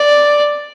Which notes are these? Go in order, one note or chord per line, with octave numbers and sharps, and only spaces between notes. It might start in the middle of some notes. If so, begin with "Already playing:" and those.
Already playing: D5